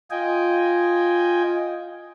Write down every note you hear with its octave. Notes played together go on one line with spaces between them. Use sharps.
F4 D#5 G5 G#5